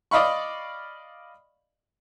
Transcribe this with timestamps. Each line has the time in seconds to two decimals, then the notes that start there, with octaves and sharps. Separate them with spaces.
0.11 D5 D#5 F5 B5 C#6